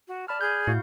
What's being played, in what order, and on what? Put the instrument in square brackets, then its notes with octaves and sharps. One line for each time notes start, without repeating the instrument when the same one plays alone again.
[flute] F#4
[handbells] D5 B5 F6 [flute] A5
[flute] G#4 [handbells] G6
[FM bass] A2 [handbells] E4 F#4 F5